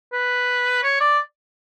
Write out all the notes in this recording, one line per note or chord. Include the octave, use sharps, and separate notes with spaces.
B4
C#5
D5